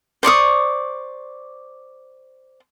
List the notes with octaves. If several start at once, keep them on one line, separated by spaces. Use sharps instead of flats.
C5 D5 C#6 D#6